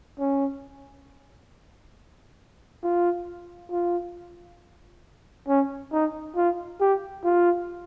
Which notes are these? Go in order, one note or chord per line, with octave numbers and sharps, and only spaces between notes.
C#4
F4
F4
C#4
D#4
F4
G4
F4